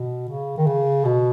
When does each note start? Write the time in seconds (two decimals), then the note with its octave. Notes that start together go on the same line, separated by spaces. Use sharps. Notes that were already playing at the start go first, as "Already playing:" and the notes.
Already playing: B2
0.29 C#3
0.58 D#3
0.67 C#3
1.05 B2